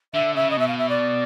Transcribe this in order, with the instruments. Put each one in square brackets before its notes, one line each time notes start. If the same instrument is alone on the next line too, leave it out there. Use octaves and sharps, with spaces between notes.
[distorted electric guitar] D3 [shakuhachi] E5
[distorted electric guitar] C#3 [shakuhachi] E5
[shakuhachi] D#5
[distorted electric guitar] B2 [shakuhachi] E5
[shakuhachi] F5
E5
D5